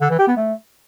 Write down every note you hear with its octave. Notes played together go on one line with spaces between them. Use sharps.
D3
E3
G4
B3
A3